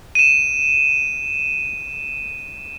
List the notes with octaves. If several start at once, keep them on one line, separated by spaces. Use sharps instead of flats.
D#7 E7